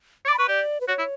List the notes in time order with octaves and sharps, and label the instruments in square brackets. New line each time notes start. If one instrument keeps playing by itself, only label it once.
[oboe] C#5
[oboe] D5 [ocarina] D6
[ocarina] B5
[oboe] B4 [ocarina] C#6
[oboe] G4 [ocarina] D5
[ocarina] B4
[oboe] F#4 [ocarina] C#5
[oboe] E4